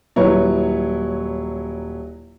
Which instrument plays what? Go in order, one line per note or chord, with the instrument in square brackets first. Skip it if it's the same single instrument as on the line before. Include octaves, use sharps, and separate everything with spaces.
[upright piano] D#1 F#3 E4 B4 C#5